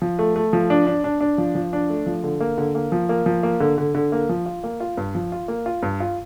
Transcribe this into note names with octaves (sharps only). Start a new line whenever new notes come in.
F3
A3
A3
F3
D4
D4
D4
D4
F3
F3
D4
A3
F3
D3
A#3
D3
A#3
F3
A#3
F3
A#3
D3
D3
D3
A#3
F3
F4
A#3
F4
G2
F3
F4
A#3
F4
G2
F4